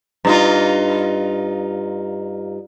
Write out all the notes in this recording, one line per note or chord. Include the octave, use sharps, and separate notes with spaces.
G2 D#4 F4